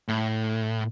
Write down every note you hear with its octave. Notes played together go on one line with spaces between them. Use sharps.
A2